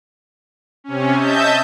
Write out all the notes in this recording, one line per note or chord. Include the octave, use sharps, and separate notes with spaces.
C3 C#4
D#5 E5 A5 G6